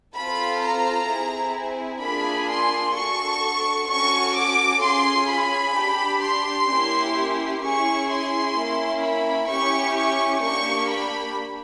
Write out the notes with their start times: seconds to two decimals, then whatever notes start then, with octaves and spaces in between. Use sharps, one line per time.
0.16 C4 F4 A4 B5
0.63 A#5
1.09 C4 E4 G#4
2.03 A#3 D4 F4 G#4 B5
2.49 C6
2.95 D4 F#4 A4 C#6
3.90 C#4 F#4 A4 C#6
4.36 D6
4.82 C#4 F4 G#4 C6
5.30 B5
5.76 D4 G4
6.22 C6
6.69 A#3 C#4 E4 G4
7.63 C#4 E4 G#4 C#6
8.09 C6
8.56 A#3 C#4 E4
9.03 B5
9.49 C#4 E4 G4 C#6
9.96 C#6
10.43 A#3 D4 G4 C#6
10.89 B5